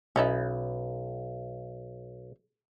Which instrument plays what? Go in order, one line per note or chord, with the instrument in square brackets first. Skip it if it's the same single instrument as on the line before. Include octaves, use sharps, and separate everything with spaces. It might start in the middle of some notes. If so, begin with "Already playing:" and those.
[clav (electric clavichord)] B1 [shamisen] C#4 D#4 E4